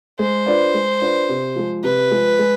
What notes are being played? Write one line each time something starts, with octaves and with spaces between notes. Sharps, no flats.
G#3 C5
D4 F4 B4 D5
G#3
D4 F4 B4 D5
C3
F3 G#3
C3 B4
F3 G#3
G#3